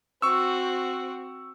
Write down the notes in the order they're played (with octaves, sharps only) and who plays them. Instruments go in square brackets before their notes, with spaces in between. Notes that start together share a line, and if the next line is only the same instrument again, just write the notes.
[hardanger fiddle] C4 F#4 [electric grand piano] C#6 E6